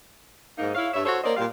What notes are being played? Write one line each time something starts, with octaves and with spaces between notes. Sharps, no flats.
G#2 A#3 D#4
E4 C#5 F5
G2 C#5 E5
F#4 A4 C5 C#5
A#3 C#4 C5 D5 D#5
A#2 G3 F5